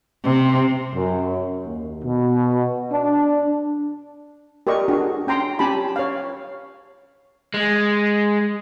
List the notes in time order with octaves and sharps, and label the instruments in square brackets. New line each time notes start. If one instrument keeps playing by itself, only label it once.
[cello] C3
[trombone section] F#2
D#2
B2
D4
[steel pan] G4 A#4 D5 D#5 C#6
D4 F#4 G#4
C#4 G5 A#5 C6
C#4 G4 G#5 A5 B5
C#5 F5
[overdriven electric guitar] G#3